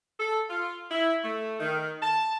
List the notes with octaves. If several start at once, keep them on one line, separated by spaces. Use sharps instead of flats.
A4
F4
E4
A3
D#3
A5